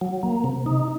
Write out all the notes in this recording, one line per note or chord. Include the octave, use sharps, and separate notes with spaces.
F#3
A#3
C3
D#4